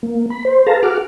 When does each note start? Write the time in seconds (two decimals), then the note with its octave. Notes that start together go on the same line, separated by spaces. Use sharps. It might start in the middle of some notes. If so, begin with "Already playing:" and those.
0.03 A#3
0.30 B5
0.45 C5
0.67 G#4 A4 B4 F5 A5 A#5
0.83 F#4 G#4 F#5 D6 F6